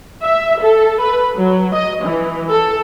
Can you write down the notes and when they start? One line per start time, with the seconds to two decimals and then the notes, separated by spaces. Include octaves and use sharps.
0.23 E5
0.61 A4
1.00 B4
1.35 F#3
1.74 D#5
2.04 E3
2.51 A4